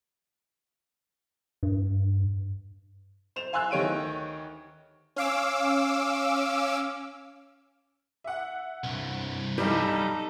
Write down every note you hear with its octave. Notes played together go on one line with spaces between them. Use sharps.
G2
C5 E7 F7
F5 G#5 C6 E6 F#6
D2 D#3 G4 C#5 D7 D#7
C#4 F5 D6 E6
E5 F#5
C2 G2
B1 G3 D#4 A4